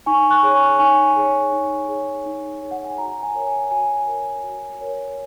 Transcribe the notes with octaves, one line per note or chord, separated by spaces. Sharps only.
D#4 G#5 C#6
C#6 F#6
G#4 C#5
G#5 C#6
D#4 G#5 C#6
G#4 C#5
D#4
G#4 C#5
D#4
G#4 C#5
F#5
G#5
F#4 F#5 A#5
G#5
A#4 C#5
G#5
F#4 G#5
A#4 C#5
F#4
A#4 C#5